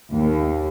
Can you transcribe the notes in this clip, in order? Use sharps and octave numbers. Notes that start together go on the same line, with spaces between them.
D#2